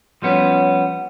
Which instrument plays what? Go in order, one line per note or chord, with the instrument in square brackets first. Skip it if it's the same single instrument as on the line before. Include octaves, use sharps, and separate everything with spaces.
[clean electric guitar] F3 G3 B3 C#4